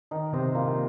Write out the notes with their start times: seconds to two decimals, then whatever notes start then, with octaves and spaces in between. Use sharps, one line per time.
0.11 D#3 D#4
0.33 C3 C5 D#5
0.55 A#2 A#3
0.66 A#2